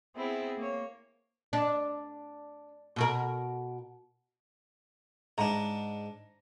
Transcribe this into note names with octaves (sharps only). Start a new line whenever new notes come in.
B3 C4 E4 G#4
A#3 C#5
D4
B2 F#4 A#4
G#2 D4 A#5